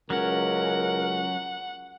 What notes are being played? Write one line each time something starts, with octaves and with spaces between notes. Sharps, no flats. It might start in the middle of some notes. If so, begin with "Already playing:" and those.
C#2 F#3 C#4 A#4 F#5